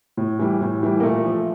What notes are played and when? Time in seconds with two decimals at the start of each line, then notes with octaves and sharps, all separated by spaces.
0.17 A2
0.39 E3 G3
0.61 A2
0.83 E3 G3
1.00 A#3
1.03 A#2 A3
1.25 F3